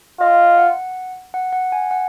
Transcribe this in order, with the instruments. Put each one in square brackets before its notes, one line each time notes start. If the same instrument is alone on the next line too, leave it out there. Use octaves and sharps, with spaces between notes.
[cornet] F4 [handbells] D#5
[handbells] F#5
F#5
F#5
G#5
F#5